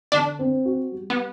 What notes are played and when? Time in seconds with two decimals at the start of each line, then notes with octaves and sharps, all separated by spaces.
0.12 D3 D4
0.39 C4
0.65 F#4
0.92 G3
1.10 B3